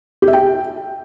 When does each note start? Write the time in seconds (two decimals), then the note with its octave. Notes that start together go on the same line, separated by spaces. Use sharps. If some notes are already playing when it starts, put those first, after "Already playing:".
0.22 G4
0.28 E5
0.33 G5